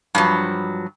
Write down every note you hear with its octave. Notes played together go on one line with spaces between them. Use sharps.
G2 F3 F#3